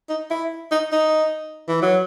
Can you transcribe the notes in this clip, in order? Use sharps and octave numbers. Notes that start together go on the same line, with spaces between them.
D#4
E4
D#4
D#4
E3
F#3